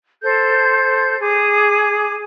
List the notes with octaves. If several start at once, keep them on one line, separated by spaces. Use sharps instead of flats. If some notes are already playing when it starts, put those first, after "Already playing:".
A4 C5 G6
G#4 D6